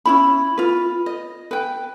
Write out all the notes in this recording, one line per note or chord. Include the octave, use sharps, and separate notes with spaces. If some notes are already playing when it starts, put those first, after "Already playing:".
C#4 E4 B5
F4 B4
D#5
B4 G5